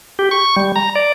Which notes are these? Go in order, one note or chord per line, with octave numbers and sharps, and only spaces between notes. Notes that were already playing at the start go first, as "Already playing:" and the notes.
G4
C#6
G3
A#5
D5